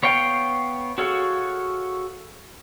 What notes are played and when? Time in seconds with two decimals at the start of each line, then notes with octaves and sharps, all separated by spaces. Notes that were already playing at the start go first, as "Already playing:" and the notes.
0.03 B3 C#5 F5 G5
0.98 F#4 G#4 A4 C#5 F5